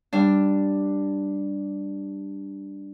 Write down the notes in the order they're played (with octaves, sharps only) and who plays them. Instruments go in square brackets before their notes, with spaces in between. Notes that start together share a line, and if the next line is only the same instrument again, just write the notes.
[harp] G3 D4